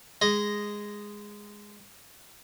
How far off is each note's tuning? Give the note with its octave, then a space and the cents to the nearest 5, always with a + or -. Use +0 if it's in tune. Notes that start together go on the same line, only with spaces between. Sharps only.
G#3 -5 D#5 +0